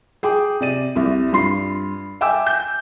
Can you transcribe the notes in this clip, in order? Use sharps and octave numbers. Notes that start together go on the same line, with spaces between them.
G#4 G5 D6
C3 D5 D#7
C2 C3
G2 F4 C6 C7
E5 G5 G#5 D6 E6
G6